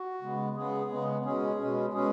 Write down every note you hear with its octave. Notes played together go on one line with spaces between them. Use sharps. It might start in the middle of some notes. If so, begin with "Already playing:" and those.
Already playing: F#4
C#3 G#3 B3
C#3 G#3 B3 G#4
C#3 G#3 B3
B2 G#3 C#4 G#4
B2 G#3 C#4
B2 G#3 C#4 G#4